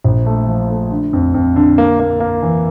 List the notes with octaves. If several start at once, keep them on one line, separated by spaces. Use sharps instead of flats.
A#1
A3
F3
A3
D3
F2
F2
D3
A#3
A#3
A#3
E3